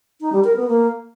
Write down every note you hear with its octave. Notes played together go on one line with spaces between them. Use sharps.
D#4
G3
A#4
B3
A#3